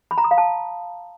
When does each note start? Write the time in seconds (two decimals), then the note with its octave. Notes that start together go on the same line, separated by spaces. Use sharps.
0.11 B5
0.18 A#5
0.24 D#6
0.31 F5
0.38 A5